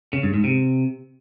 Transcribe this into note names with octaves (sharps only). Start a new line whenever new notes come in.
C#3
G2
G#2
C3